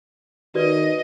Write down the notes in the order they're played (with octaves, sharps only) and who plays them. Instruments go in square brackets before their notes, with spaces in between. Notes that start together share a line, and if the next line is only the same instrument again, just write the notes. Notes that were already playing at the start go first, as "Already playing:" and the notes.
[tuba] D#3 [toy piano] F#4 B4 D5 [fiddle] D#5